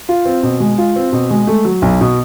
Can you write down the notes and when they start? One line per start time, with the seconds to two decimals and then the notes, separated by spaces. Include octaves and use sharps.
0.09 F4
0.25 C4
0.43 B2
0.60 G#3
0.78 F4
0.96 C4
1.12 B2
1.31 G#3
1.47 A3
1.65 F#3
1.82 B1
2.01 B2